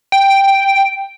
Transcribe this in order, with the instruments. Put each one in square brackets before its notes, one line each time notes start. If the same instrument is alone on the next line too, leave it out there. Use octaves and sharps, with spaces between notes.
[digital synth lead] G5